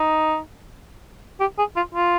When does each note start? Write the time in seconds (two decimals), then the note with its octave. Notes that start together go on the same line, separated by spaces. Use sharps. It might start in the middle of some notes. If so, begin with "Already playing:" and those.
Already playing: D#4
1.40 G4
1.58 G#4
1.76 F4
1.95 F4